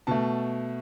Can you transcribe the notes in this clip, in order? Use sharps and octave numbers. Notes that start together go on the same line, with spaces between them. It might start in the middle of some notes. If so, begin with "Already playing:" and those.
B2 A3 A5